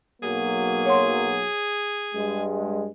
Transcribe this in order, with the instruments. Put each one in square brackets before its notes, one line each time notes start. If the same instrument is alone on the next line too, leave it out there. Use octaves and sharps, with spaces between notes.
[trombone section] B1 F#3 A#3 [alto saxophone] G#4
[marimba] C#5 F#5 C6
[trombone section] G2 G#3